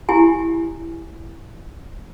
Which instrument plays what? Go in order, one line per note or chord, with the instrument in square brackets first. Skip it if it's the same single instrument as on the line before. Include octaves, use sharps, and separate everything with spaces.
[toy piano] E4 G4 G#5